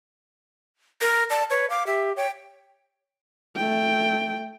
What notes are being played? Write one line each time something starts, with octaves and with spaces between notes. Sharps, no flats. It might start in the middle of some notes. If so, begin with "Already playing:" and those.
A#4
D5 A5
B4 C#5
F5 D6
G4 E5
C#5 G5
A3 G5